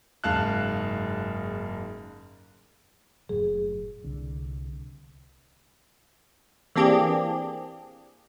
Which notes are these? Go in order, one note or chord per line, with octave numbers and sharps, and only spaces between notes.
F#1 G#2 F5 A5 F#6
F#1 A2 F#3 G#4
C2 D3
E3 A#3 C4 D4 G4 G#4